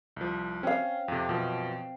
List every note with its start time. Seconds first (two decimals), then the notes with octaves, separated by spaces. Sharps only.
0.16 C2 F3
0.63 C4 C#4 F5
1.08 F2 C3
1.29 F#2 B2 F3